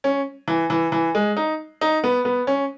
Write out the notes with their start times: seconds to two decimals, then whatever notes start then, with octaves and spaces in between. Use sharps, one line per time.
0.04 C#4
0.48 E3
0.70 E3
0.92 E3
1.15 G#3
1.37 D#4
1.81 D#4
2.04 B3
2.25 B3
2.47 C#4